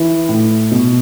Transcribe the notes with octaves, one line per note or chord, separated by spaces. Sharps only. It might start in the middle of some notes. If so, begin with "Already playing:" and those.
Already playing: E3
A2
B2